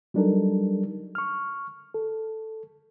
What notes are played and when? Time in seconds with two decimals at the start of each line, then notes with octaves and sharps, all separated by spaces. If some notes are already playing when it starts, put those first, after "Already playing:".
0.14 F#3 G3 D4 D#4 A4 A#4
1.15 C#6 F6
1.94 A4